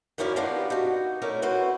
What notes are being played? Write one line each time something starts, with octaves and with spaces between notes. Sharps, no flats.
F#2 B3 C#4 E4 D5 F5
B3 D4 D#4 F4 G4
D#4 F#4
A3 C#4 E4 A#4 D5
C4 E4 F#4 B4